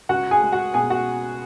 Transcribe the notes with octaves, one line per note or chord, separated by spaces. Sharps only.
C#2 F#4 F#5
G#4 G#5
G#3
F#4 F#5
B2 G#4 G#5
F#4 F#5